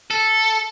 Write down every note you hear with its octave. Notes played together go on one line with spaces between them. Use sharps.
A4